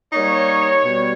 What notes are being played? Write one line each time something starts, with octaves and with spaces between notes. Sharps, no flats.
G3 A#3 D#4 C#5
B2 G3